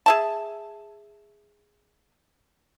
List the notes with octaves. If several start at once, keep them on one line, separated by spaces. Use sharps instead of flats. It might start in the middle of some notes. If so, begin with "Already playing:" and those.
G#4 E5 A5